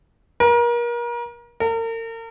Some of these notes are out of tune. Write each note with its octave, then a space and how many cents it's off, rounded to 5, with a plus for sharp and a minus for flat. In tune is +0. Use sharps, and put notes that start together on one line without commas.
A#4 +35
A#4 -40